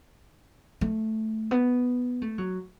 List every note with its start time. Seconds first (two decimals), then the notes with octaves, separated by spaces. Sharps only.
0.81 A3
1.51 B3
2.22 A3
2.38 F#3